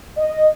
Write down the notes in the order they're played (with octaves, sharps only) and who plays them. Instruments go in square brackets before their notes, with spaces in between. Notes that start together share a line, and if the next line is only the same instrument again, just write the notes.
[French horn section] D#5